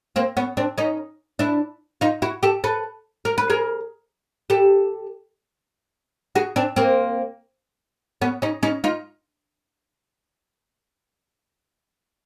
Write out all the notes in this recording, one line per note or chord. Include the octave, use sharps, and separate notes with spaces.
A#3 C4
B3 C#4
C4 D4
C#4 D#4
D4 E4
D#4 F4
E4 F#4
G4 A4
A4 B4
A#4
B4
G#4 A#4
G4 A4
F#4 G#4
C4 D4
A#3 C4
B3 C#4
C#4 D#4
C#4 D#4
D#4 F4